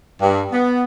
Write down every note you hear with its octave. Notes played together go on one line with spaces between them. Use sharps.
G2
B3